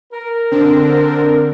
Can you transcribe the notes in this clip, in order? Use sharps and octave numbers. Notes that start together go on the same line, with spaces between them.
A#4
D3 C4 D4